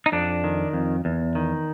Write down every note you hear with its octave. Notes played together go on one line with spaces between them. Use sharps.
D#4
F2 D4
D#3
F2
E2
D#3